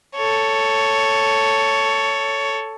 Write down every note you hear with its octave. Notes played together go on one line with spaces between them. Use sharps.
A4 C#5